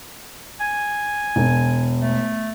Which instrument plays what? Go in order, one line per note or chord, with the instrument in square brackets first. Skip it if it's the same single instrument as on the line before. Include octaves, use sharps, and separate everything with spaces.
[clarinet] G#5
[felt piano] E1
[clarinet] A3